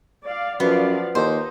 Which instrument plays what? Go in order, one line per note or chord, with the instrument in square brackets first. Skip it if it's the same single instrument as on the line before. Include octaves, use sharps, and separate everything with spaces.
[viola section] D5 F5
[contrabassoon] F#2 [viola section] F3 D5 F5 [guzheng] B3
[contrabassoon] D#2 [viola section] D#4 [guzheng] C5